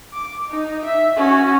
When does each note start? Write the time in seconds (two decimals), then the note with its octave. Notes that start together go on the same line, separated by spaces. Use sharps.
0.13 D6
0.49 D#4
0.85 E5
1.17 C#4 F#4